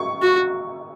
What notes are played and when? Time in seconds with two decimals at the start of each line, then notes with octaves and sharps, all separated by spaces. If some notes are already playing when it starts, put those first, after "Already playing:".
Already playing: C#6
0.22 F#4